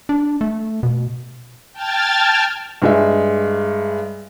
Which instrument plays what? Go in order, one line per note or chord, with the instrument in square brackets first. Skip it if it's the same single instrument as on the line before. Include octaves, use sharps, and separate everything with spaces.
[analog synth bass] D4
A3
B2
[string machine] G5 A5 F6 G#6 A6
[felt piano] G2 G#3 E5